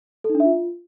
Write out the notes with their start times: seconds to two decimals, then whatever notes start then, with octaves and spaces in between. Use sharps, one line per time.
0.24 A4
0.30 D#4
0.35 D4
0.40 E5
0.45 F4